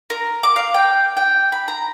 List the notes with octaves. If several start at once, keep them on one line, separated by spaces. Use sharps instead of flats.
A#4
D6
F5
G5
G5
B5
A#5